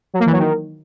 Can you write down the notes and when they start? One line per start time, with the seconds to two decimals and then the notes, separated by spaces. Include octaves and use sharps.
0.14 F#3
0.20 A#3
0.26 E3
0.33 F#3
0.39 D#3